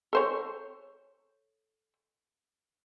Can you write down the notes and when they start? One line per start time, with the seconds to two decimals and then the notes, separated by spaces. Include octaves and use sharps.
0.13 A4 C5 C#5